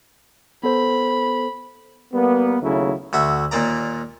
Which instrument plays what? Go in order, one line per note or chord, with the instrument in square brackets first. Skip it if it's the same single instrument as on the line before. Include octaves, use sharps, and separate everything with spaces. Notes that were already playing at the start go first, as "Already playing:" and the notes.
[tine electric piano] B3 A4 C5 [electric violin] B5
[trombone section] G3 A#3 B3
D#2 C#3 F#3 A3 E4
[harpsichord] D2 F#4 E5
D#2 A#2 A#3 D5 A#5